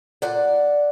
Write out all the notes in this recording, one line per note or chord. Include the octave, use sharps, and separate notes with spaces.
A#2 D5 F#5